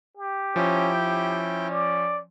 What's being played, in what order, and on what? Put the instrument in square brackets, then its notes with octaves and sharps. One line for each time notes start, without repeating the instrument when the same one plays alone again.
[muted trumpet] G4
[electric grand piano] F3 [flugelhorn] C#4 [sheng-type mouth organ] E4 G5
[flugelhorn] C#4
[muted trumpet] D5